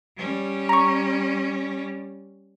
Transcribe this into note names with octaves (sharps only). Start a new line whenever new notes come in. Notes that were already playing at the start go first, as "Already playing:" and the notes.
G3 C#4
A#5 C#6